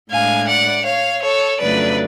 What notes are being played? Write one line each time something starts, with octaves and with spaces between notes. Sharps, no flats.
A2 G#3 D4 F5 G#5
D5 F#5
C#5 F5
A4 C#5
F2 C#3 F#3 A3 D4 B4 D5